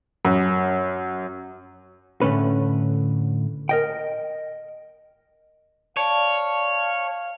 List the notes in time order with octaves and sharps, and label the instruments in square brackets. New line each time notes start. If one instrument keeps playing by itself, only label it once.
[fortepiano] F#2
[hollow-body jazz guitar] A2 D3 A3 C#4 B4
A#4 D#5 G5
[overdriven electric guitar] C#5 [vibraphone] D5 A5 [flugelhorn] F5